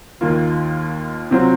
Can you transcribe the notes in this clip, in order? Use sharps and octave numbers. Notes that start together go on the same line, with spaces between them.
D#2 D#3 A#3 F4
C3 F#3 C4 F4